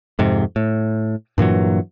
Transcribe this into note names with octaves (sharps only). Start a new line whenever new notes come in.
F2 G#2 C3
A2
G2 A#2 E3 F#3